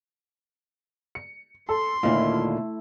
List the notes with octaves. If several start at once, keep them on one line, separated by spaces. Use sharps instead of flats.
C#7
A4 C6
D#2 A#2 D3 A3 E4 F4